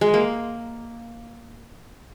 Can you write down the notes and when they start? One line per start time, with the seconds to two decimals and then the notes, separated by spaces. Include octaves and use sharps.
0.01 G#3
0.14 A#3